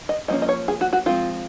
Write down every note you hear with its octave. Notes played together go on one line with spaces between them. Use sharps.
D#5
F3 A#3 C#4 D#5
D#5
C#5
G#4
F#4
F#4
F3 G#3 C4 F4